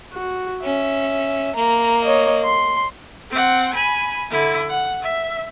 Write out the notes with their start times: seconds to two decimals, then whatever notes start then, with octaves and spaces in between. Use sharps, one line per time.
0.13 F#4
0.64 C#4 E5
1.55 A#3 A#5
2.04 C#5 D#5
2.44 C6
3.31 C4 F#5
3.73 G#5 B5
4.30 D3 E4
4.69 F#5
5.02 E5